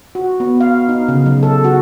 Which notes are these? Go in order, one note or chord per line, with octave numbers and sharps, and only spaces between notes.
F#4
B3
F5
D#4
C#3
F#3
A4
F#4